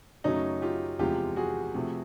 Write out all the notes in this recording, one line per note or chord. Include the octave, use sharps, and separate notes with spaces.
F#2 C#3 F#3 A3 C#4 D#4
F4 G4
E2 C3 F3 G#3 F4 G4
F#4 G#4
C3 F3 A3